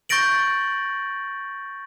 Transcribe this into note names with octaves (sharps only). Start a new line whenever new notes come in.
C#6 G6 A6 A#6 D7 F#7